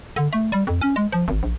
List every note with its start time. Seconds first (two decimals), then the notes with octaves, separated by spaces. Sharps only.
0.16 D3
0.33 A3
0.52 G3
0.67 F2
0.81 C#4
0.96 G#3
1.12 F3
1.28 G#1
1.43 A#1